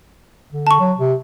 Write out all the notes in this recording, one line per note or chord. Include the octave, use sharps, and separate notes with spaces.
D3
A5 C#6
F#3
C3